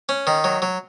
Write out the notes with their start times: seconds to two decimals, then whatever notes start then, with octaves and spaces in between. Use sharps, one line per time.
0.09 C#4
0.27 D#3
0.44 F#3
0.62 F#3